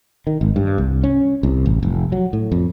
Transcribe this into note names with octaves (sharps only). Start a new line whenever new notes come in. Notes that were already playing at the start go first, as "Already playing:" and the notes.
D#3
G#1
G2
C2
C#4
C2
A1
F1
F#3
A2
F2